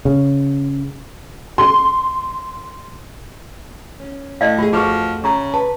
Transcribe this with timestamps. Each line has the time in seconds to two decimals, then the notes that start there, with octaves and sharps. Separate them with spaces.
0.05 C#3
1.58 C6
4.00 C#4
4.41 A2 D5 D#5 F5
4.59 A3 F4 G4 G#4
4.73 F2 F3 A3 F#4 G#4 B4 C#6
5.24 C#3 A#5 C#6
5.54 B4 A5